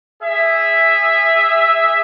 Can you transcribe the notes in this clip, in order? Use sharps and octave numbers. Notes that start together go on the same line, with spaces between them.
G#4 E5